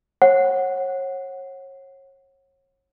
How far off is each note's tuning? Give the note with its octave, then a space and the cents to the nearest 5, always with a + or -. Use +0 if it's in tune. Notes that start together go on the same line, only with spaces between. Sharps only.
C#5 -35 F#5 +0